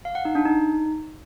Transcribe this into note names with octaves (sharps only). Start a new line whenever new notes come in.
F5
F#5
D#4
D4
D#4